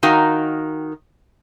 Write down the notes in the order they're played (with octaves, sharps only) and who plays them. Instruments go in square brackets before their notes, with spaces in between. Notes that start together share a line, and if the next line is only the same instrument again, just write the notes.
[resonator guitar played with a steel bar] D#3 D#4 F#4 A#4 F5 G5